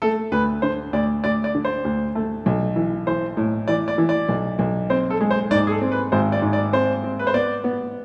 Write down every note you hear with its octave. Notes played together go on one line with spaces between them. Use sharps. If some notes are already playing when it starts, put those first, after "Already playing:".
A3 A4
D2 B4
D3 C5
D2 D5
D2 D5
D5
D3
C5
D2
A3
B1
E3
E3 C5
A2
E3 D5
D5
E3
D5
B1
B1
C4 C5
A4
G#3
C5
G#2 D5
G#4
A4
C4
B4
G#1 C5
D5
G#2
D5
C4 C5
C4
B4
C5
B3 D5
B3